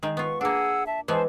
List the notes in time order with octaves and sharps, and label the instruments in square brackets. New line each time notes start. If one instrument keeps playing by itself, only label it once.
[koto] D#3 G#3
[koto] B3 F4 [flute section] C#6
[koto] A#3 D4 [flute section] G#4 F#5 E6
[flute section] E5 A5
[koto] E3 G#3 B3 [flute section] C5 A5